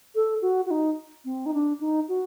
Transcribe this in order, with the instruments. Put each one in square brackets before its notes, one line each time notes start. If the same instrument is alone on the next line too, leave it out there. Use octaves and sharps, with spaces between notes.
[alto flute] A4
F#4
F#4
D#4
C4
D#4
D4
D#4
F#4